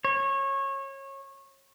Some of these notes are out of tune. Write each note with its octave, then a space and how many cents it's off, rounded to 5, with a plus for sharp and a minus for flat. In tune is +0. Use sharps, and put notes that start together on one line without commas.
C#5 -25